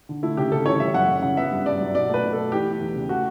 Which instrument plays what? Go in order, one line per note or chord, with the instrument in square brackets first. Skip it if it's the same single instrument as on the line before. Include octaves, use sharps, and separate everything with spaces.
[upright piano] D3
A3 E4
C#3 G4
C#3 A4
E3 C#5
G3 E5
F#2 F#5
F#2
C#3 F#5
B3 E5
G2
G2 D5
F#3
B2 D5
A3 B4
B2
A4
A3
E3 G4
B3
E2
C#3
A3 F#4